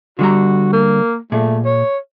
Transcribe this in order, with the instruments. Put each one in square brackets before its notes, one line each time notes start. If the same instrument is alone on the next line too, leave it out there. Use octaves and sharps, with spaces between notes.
[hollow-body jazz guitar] D3 G3 A#5 [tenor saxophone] F#4
[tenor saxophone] A#3
[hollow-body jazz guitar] A#2 G#4 [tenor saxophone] A3
[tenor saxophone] C#5